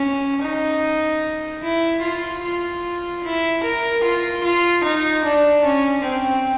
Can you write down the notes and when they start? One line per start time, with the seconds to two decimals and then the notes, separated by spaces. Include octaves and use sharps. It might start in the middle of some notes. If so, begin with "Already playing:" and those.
Already playing: C#4
0.42 D#4
1.63 E4
2.03 F4
2.43 F4
3.24 E4
3.63 A#4
4.03 F4
4.44 F4
4.84 D#4
5.24 D4
5.64 C#4
6.04 C4